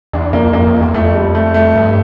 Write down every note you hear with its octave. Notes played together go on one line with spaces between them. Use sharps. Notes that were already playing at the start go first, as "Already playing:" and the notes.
E2 D4
F2 A#3
F2 A#3
F2
E2
F2 A3
G3
A3
A3
G2